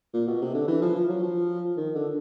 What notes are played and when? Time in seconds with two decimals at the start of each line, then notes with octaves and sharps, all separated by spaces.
0.14 A#2
0.28 B2
0.41 C3
0.55 D3
0.68 E3
0.82 F3
0.95 F3
1.09 F#3
1.23 F3
1.77 D#3
1.95 D3